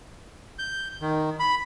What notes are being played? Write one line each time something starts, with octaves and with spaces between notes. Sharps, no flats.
G6
D#3
B5